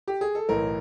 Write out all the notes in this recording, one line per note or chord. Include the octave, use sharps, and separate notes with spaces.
G4
G#4
A4
B1 A2 E3 A#4